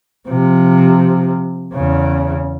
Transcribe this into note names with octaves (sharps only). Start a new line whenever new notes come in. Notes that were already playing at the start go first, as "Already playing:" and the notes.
C3 F3
E2 C#3